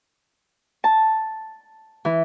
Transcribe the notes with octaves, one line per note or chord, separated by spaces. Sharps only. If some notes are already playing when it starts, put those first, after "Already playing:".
A5
E3